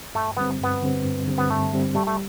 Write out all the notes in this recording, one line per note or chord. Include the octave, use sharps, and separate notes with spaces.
G2 A3
D3 G3 B3 C4
G2 B3
D3 G3 C4
G2
D3 G3 C4
B3
G2 A3
D3 G3 C4
G3 A3
A3